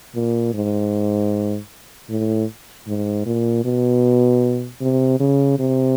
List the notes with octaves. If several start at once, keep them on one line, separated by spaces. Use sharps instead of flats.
A#2
G#2
A2
G#2
A#2
B2
C3
C#3
C3